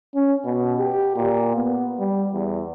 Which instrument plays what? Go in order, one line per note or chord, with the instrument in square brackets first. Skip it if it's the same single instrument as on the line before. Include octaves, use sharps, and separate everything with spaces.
[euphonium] C#4
B2
G4
A#2
B3
G3
E2